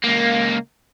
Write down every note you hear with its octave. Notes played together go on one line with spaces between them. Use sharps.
C#2 A#3